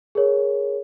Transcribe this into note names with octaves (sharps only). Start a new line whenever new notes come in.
G#4 A#4 C#5